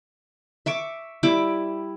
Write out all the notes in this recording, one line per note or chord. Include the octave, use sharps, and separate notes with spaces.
E5 C#6 D6
G3 E4 D6